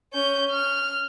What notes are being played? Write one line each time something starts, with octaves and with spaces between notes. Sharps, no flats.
C#4 G6
F6